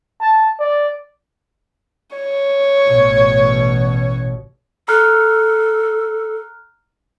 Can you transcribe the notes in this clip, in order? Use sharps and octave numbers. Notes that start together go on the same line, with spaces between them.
A5
D5
C#5
A1 B2
A4 A#5 F6 F#6